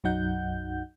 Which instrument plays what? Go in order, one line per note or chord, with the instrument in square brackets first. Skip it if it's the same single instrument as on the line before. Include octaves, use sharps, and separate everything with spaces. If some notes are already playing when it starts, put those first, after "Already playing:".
[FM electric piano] B1 F#2 F#3 D#4 F#5 G6